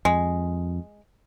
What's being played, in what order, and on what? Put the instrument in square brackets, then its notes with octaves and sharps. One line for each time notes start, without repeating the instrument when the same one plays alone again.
[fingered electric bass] F2 [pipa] G#3